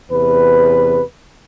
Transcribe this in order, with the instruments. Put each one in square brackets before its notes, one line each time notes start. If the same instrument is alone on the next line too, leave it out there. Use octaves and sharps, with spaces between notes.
[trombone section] E2 C3 B4